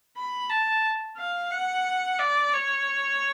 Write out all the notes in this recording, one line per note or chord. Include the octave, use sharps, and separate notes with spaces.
B5
A5
F5
F#5
D5
C#5